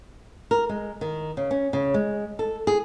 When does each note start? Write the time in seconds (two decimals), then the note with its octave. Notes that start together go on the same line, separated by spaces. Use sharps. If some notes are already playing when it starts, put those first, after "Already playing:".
0.51 A#4
0.69 G#3
1.01 D#3
1.37 C#3
1.51 C#4
1.73 C#3
1.94 G#3
2.39 A4
2.67 G#4